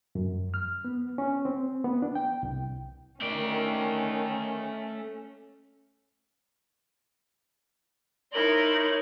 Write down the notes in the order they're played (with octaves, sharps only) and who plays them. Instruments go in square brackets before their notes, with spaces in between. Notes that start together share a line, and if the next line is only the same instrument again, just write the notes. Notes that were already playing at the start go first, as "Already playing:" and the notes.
[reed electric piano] F#2
F6
B3
C#4
C4
B3
D4
G5
C2
[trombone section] D#3 [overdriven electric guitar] A3 D5 [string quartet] C#4
[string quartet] D#4 E4 C6 [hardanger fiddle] A#4 [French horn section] C#5 [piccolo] F#7